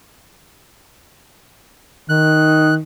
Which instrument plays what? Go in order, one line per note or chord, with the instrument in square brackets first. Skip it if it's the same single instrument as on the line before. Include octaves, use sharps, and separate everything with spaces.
[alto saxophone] D#3 [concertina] F#6